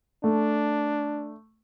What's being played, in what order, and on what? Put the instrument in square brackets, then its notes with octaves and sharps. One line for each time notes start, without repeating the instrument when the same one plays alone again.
[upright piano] A3 [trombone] D4